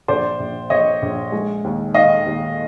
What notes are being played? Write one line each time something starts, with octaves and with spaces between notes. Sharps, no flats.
A#1 C5 D5
A#1
A#1 C#5 D#5
A#1
G#3
D#2
D#3 D#5 F5
D#2